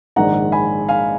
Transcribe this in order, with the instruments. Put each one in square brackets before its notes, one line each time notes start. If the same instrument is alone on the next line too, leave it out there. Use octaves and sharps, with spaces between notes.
[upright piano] A#1 G#2 D#3 F#5 A#5
G#5 B5
F5 G#5